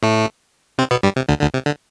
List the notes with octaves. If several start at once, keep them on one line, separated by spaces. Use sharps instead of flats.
A2 A3
C3 C4
B2 B3
G2 G3
C3
D2 D3
D2 D3
C3
D3